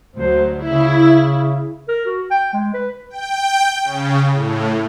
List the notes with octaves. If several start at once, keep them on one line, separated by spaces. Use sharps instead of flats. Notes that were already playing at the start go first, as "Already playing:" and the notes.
D2 F#3 C5
C#3 E4
A#4
F#4
G5
G#3
B4
G5
C#3
A2